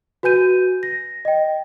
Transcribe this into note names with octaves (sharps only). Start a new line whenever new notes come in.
F#4 B4 G#5 G6 D#7
A#6
D#5 G5